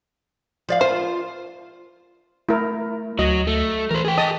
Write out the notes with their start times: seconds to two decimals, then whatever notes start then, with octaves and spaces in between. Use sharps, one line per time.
0.69 F3 D5 F5
0.81 F4 C5
2.49 A3 E4 A#4
3.19 D2 F#3 D#5
3.47 A3
3.91 E3 A#4 C5
4.05 G#4 G5
4.18 D#5 A5 D#6